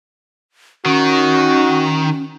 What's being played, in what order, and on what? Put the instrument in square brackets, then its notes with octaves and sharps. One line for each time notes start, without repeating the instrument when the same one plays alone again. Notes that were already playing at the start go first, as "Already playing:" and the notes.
[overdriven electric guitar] D#3 [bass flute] C#4 [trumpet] F#4